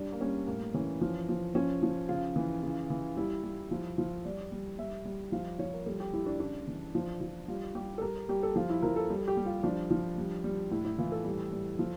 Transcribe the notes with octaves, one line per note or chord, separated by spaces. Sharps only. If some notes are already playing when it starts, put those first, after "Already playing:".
Already playing: G3 D4
A#3
G3 C#4
A2 A#3
E3 C#4
F3
F3
F3 C#4
F3
C#3 F4
E3
C#3
E3
G3 E4
G3
F3
F3
G3 D5
G3
G3 E5
G3
F3 F5
F3 C#5
A#4
G3 A4
G4
G3 E4
D4
C#3 D4
E3
F3
F3
G3 F4
G3 G4
A4
G3 A#4
G3 G4
A4
F3 F4
E4
F3 A#4
A4
G3
A4
G4
G3
F4
F3 D4
F3
G3
G3
A2 E4
E4
E3 F4
A4
G3
G3
F3